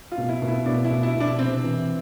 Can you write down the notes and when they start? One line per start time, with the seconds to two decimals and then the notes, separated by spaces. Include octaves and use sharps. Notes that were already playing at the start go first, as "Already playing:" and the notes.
0.12 F4
0.18 B2
0.29 E4
0.42 B2
0.48 E4
0.66 B2 D4
0.84 E4
0.90 B2
1.03 E4
1.15 B2
1.20 D4
1.39 C3 C4
1.64 E3